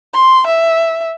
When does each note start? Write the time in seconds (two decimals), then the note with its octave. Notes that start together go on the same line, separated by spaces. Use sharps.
0.13 C6
0.47 E5